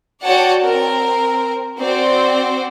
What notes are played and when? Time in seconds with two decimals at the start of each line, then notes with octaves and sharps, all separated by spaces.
0.23 F#4 C#5 D5 F#5 G5 A5
0.64 C4 A#4
1.79 C4 F#4 C5 D5